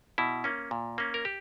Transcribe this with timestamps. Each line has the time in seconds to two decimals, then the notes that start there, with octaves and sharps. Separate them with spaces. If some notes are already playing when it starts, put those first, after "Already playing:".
0.18 B2 E4
0.44 A#3 C#4
0.71 A#2
0.98 A#3 C#4
1.14 A#4
1.25 G4